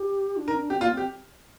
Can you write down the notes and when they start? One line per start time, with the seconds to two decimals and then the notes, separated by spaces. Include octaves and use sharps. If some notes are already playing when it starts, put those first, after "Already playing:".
Already playing: G4
0.37 D4
0.47 D#4 A#4
0.54 C4
0.58 D4
0.70 C4 G4
0.81 A#3 F4
0.92 C4
0.97 G4